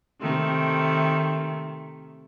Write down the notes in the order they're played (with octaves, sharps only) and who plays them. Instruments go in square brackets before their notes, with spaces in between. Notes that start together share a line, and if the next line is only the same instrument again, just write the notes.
[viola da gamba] C3 D#3 A3